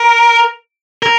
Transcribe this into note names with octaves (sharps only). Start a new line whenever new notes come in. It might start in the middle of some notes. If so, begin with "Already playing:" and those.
Already playing: A#4
A#4